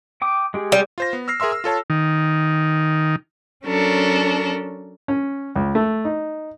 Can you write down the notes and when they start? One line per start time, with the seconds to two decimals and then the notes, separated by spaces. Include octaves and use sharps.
0.22 G5 D6 D#6
0.54 G#3 G4 G#4
0.72 G3
0.98 F4 C5 A#6
1.13 B3
1.28 E6 F6 A#6 C7
1.40 G#4 A#4 E5 C6 E6
1.52 E6
1.64 F4 A4 C#5 A5
1.90 D#3
3.65 F#3 C#4 D4 A4 A#4
5.08 C#4
5.56 C#2
5.75 A3
6.05 D#4